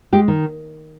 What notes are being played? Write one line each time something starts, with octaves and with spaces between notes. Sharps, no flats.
G#3 G4
D#3